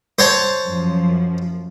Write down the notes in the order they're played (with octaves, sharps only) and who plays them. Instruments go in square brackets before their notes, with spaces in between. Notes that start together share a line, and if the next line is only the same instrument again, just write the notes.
[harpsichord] C5 C#5 A5
[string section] F#2 F3